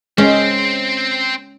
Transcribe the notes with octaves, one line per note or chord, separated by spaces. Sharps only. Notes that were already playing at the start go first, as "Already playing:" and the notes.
G#3 C4 C#4 C5